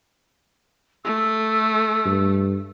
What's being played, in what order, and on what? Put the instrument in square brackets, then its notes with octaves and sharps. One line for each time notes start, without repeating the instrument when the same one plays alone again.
[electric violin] A3 [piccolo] E6
[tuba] G2